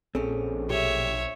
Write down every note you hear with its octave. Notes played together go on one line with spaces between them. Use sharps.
A#1 C4 C#4 G#4 A4
B1 G4 C#5 E5